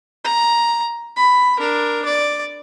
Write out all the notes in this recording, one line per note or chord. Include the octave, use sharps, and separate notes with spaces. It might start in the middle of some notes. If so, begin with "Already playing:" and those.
A#5
B5
D4 A#4
D5